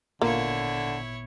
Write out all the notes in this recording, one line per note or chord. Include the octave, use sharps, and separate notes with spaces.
G#1 A#2 D3 A#3 B3 E4 F4 C#5